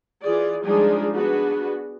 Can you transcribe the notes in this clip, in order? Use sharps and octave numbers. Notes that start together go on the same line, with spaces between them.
E3 F4 G#4 D5
F3 G3 G#3 D4 D#4 G#4
B3 D4 F#4 G#4 B4